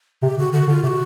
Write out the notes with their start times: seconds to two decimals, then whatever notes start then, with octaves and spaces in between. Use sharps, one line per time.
0.23 C3 G4
0.38 C#3 F#4
0.53 D3 F#4
0.68 D3 F4
0.83 C3 G4
0.87 F#4